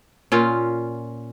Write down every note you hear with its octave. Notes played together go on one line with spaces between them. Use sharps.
A#2 C#4 F4